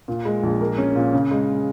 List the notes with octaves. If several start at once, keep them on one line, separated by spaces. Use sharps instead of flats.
A#2
G#3
A#1
A#3
C#4
A#2
C#3
G#3